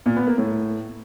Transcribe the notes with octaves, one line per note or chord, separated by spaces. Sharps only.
A#2
B3
A#3
A2